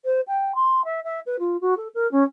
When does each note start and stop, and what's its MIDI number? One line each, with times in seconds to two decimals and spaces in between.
0.05 0.21 72
0.27 0.52 79
0.55 0.84 84
0.85 1.00 76
1.04 1.20 76
1.26 1.36 71
1.39 1.57 65
1.61 1.77 66
1.77 1.88 69
1.94 2.10 70
2.12 2.23 61